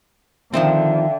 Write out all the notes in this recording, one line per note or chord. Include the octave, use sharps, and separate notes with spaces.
D3 D#3 F3 C4 E5 F5 G5